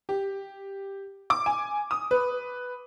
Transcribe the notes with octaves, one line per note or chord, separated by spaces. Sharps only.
G4
D6
G#5
D#6
B4